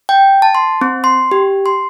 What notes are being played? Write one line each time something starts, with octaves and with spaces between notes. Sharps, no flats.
G5
A5
C6
C4
C6
G4
C6